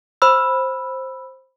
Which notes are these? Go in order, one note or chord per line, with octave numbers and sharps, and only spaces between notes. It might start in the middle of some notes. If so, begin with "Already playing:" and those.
C5 B5 E6